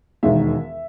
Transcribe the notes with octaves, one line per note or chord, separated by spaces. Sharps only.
E1 D#2 D#3 G#3 E5